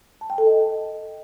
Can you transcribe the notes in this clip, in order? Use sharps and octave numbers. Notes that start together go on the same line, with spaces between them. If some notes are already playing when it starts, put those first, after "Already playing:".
A5
G5
A4
D#5